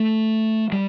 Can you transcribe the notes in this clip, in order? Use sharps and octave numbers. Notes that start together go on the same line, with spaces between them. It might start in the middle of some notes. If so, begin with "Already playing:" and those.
Already playing: A3
G3